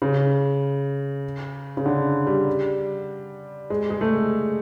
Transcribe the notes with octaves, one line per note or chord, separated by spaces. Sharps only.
C#3
C#3
D3
G3
G#3
G#3
A3